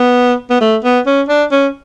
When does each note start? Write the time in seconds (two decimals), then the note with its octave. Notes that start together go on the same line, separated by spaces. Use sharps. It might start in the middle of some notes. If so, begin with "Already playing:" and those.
Already playing: B3
0.50 B3
0.61 A3
0.84 B3
1.06 C#4
1.29 D4
1.52 C#4